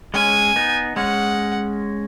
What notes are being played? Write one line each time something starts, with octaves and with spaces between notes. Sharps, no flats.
G#3 C#4 G#5
B3 D#4
G#3 C#4 F#5